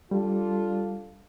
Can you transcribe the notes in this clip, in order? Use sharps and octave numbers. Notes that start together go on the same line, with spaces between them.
G3 D4 F4 A4